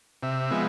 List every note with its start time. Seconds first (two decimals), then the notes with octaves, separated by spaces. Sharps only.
0.23 C3 E5
0.51 F3 G#3 B3